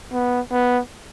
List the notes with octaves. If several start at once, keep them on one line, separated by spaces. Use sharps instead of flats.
B3
B3